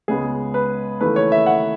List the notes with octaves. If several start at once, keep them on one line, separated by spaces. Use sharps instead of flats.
C#2 C#3 G#3 B3 G#4
B4
D#2 C#3 E3 A3 B4
C#5
E5
F#5